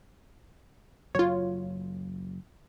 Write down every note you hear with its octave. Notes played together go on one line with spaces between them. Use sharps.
F#1 F#3 F4 C#5